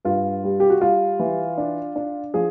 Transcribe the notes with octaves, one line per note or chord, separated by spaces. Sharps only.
G2 F4
G3
G4
F#4
G3 F4
E3
D4
D4
F3 G#4